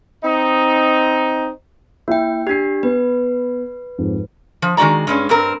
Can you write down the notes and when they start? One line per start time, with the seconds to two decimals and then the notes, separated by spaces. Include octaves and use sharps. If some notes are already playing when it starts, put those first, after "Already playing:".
0.23 C4 D#4
2.08 A#3 E4 E5 G5
2.47 D4 G4 G#6 C7
2.83 B3 B4
3.98 F2 G#2
4.62 F3
4.77 D#3 G#3 D4 F#4 D5 A#5
5.07 G2 G#3 C#4
5.29 G2 C4 A#4